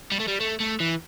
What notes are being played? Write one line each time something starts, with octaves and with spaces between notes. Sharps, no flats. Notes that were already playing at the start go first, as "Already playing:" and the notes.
G3
A3
G3
A3
A3
E3